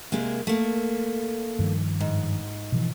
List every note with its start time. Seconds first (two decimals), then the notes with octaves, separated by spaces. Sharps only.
0.12 C3 G#3 A#3
0.47 A3 A#3
1.59 G2 D#3 F3
2.00 G#2
2.72 B2 E3 F3